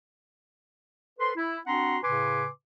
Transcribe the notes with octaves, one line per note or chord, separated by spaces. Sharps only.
A4 B4 C5 C6
E4
C4 D4 F#4 F#5 A#5 C6
A2 C#3 B4 G#5 C6 D6